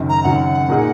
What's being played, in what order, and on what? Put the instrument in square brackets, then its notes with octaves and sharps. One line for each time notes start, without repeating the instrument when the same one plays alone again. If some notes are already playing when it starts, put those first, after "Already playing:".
Already playing: [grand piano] F#1 F#2 D#3
[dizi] A#5
[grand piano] F#1 F#2 D#3 [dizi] F#5
[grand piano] A#2 A#3 D#4 G#4